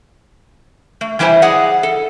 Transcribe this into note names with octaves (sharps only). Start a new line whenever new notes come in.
A3
E3 G3 E4 G4 C5 G#5
G#4 D5 D#5 F#5
A4